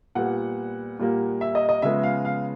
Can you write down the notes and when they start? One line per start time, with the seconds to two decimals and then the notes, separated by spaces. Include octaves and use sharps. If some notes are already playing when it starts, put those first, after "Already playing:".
0.15 A#2 G3 B3 F#5
0.99 A#2 G3 A#3
1.41 E5
1.55 D#5
1.69 D#5
1.82 C#3 F3 G#3 B3 E5
2.03 F5
2.25 F5